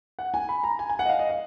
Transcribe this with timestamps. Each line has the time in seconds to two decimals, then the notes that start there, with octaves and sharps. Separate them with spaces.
0.19 F#5
0.34 G#5
0.49 B5
0.64 A#5
0.79 G#5
0.89 G#5
0.99 F#5
1.05 D#5
1.09 F5
1.19 D#5
1.29 F5